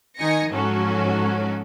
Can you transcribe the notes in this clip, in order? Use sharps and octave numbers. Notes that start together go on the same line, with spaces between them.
D#3 D#4 G#5 A#6 C#7
G#2 F3 F#3 C#4 F#4 A4